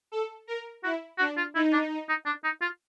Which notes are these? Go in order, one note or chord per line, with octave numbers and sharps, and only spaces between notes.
A4
A#4
E4 F#4
D4 F#4
F4
D#4 E4
D4
D#4
D4
D#4
F4